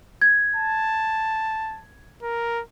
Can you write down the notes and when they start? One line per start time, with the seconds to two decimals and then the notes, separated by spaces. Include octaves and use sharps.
0.22 G#6
0.56 A5
2.23 A#4